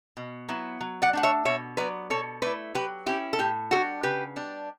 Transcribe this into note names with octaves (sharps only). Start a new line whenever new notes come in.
B2
F#3 B3 E4
F#3
D5 F#5
A3 D4 F#5
C#5 E5
B2 C#5 E5
F#3 B3 B4 D5
B2 A4 C#5
A3 E4 B4 D5
F#3 G4 B4
C#4 E4 G4
A4
A2 G4
G3 D4 F#4 A4
C#3 G4 B4
G3 D4